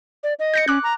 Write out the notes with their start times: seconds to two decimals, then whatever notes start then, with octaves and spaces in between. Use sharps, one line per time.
0.23 D5
0.39 D#5
0.54 G6 A#6 C#7
0.68 C#4 D6 F#6
0.83 A#5